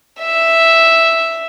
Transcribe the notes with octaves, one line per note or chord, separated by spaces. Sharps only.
E5